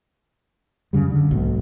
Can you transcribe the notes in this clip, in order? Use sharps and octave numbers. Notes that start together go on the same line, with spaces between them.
F#2 C#3 G3
D3
B1 G#2 A#3